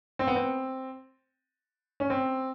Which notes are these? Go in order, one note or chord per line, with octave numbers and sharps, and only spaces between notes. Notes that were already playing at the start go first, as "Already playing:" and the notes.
C4
B3
C4
C#4
C4